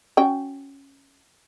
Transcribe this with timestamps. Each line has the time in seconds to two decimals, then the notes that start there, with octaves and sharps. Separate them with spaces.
0.17 C#4 F#4 G5